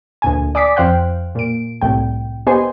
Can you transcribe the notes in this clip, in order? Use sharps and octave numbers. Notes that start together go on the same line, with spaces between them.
D2 A#2 G#5
D5 G#5 D6 D#6 B6
F2 C5 F5 G5 F#6
A#2 D7
C2 A2 G5
B3 G4 C5 D#5 G#5 C6